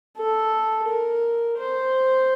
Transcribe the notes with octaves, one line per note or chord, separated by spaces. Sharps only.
A4
A#4
C5